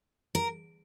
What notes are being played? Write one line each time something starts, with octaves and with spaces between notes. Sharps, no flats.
A#4